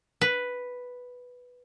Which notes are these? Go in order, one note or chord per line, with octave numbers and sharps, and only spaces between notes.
B4